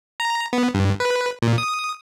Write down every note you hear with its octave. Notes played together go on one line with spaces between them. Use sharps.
A#5
B3
G2
B4
A#2
D#6